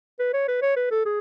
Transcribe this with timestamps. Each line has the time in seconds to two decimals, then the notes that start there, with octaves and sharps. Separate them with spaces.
0.19 B4
0.33 C#5
0.48 B4
0.62 C#5
0.76 B4
0.91 A4
1.05 G#4